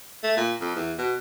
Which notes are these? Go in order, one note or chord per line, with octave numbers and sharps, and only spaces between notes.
A3
A#2
F2
E2
B2